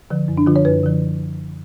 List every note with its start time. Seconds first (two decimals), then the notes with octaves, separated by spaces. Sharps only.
0.10 D3 F3
0.28 F#2
0.37 D4
0.46 D3 F3 F4
0.56 C#5
0.65 F#2 B4
0.83 D3 F3